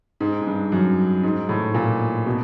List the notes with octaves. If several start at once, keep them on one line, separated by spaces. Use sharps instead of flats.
G#2
G#2
G2
F#2
G#2
A2
A#2
B2